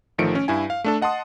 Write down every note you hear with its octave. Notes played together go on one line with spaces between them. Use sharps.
A1 D#3 F3 A3 C#7 D7
C#4
G2 E4 G#5
F5
A3 D4 A4
D#5 F#5 A5 C6 D#6